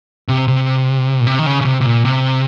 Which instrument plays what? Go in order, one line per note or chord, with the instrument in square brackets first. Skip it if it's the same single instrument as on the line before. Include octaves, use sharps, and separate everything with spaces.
[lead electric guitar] C3
C3
A#2
C3
D#3
C#3
C#3
C3
C3
A#2
C3